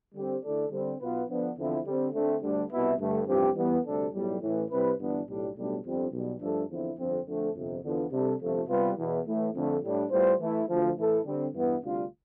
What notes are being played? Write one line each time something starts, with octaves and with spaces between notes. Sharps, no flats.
D3 G3 C4 G4
D3 A3 E4 A4 D5
D3 G3 C4
B1 B2 B3 F4 B4
D3 F3 B3 D4
E2 D3 F3 C4 E4
D3 G3 C4
D2 D3 A3 C4
D2 D3 G3 D4
C2 B2 B3 E4
G2 D3 A3
A1 G2 F3 C4 G4
E3 G3 B3
D2 C3 G3 D4 A4
B1 A2 G3
A1 A2 E3
C3 G3 C4 E4 B4
G1 G2 E3 B3 D4
B1 A2 G3 D4
B1 A2 G3 D4
G1 F2 D3 G3 C4
B1 B2 G3
G2 F3 A3 D4 A4
E2 D3 F3 C4 E4
G1 F2 D3 F3 C4
F2 D3 A3 C4
G1 F2 C3
E2 D3 F3 B3
C3 G3 D4 A4
G1 F2 C3 F3 A3
C3 G3 B3 F4 B4
E2 B2 B3 E4
A2 E3 A3
F2 D3 A3
A2 G3 D4
A2 G3 B3 F4 C5
E3 A3 E4
D2 D3 F3
A2 E3 A3 E4 A4
D3 G3 C4
G2 E3 B3 E4
D2 C3 G3 D4 F4